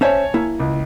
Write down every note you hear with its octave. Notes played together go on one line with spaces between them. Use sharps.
C#4 C5 C#5 E5 G#5 A5
A#3 E4
C#2